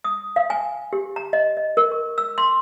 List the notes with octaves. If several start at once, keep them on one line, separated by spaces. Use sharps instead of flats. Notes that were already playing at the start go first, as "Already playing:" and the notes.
D#6
F5
G#5
G4
A#5
D#5
D#5
A#4
C#6
E6
C6